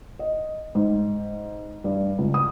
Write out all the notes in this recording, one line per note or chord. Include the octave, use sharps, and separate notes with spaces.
D#5
G#2
G2
C#2
D#6